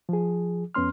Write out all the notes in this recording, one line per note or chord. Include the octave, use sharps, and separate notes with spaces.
F3 G#4
F2 B3 C#4 C6 F6